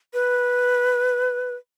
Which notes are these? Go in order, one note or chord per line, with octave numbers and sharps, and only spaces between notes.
B4